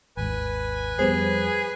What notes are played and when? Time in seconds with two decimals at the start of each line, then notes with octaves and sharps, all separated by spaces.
0.17 G#1 D#2 G#2 B4 G#5
0.99 F2 G3 B3 G#4 C5